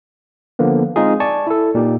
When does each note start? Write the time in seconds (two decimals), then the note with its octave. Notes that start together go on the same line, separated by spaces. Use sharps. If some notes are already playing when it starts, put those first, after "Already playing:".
0.59 D3 F3 A#3 B3
0.96 G#3 C4 D#4 F4 G#4
1.20 D5 G#5 A5 C#6
1.47 E4 A4
1.75 A#2 D#4 G4